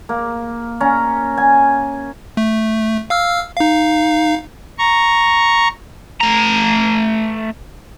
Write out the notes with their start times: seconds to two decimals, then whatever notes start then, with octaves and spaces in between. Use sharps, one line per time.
0.09 A#3
0.80 C#4 A#5
1.37 G#5
2.37 A3
3.10 F5 E6 F6
3.56 D#4 F5
4.79 A#5 C#6
6.21 A3 A#5